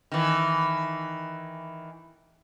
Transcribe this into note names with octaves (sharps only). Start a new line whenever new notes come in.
D#3 E3